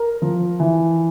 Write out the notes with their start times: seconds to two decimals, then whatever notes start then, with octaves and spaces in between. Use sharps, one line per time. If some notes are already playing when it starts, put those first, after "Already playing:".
Already playing: A#4
0.22 F3
0.60 E3